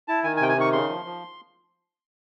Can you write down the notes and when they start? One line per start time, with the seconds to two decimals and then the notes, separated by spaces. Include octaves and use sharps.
0.08 E4 A5
0.24 D#3 G#5
0.37 G#5
0.40 C3 G5
0.48 G#5
0.57 D#3 C#6
0.73 C#3 C6
0.89 F3
1.05 F3